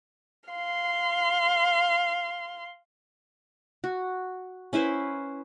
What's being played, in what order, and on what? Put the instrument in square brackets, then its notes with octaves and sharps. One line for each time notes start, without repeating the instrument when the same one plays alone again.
[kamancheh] F5 C6
[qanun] F#4
C#4 E4 B4 C5